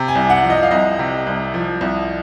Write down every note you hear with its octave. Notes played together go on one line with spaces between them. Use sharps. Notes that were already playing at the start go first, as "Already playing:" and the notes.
Already playing: C3
G#5
C2
F#5
F3
D#5
F5
C2 D#5
C3
C2
F3
C2